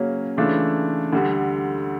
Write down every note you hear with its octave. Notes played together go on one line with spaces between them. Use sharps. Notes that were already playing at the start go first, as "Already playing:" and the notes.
Already playing: C#3 F#3 A#3 C#4
C#3 E3 A3 D4 F4
D2 D3 G3